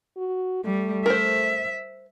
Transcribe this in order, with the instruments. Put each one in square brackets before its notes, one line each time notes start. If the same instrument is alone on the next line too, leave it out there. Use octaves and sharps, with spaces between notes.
[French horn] F#4
[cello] G3 [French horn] A3
[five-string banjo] A#4 C5 [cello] E5